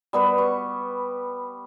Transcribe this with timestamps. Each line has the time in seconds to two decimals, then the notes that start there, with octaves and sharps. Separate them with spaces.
0.13 G3 B3 B4
0.38 C#6